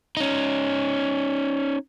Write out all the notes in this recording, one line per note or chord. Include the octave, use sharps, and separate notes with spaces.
C#4 D#4